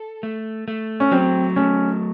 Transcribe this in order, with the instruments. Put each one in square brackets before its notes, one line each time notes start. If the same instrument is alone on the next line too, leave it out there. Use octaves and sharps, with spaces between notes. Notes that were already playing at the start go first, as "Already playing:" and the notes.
Already playing: [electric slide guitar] A4
A3
A3
[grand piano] C#4
[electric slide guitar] F#3 [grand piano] C4
[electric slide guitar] A3 [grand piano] C#4